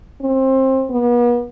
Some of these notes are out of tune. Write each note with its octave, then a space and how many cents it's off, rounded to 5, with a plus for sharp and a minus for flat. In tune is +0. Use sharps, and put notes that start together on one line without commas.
C4 +20
B3 -40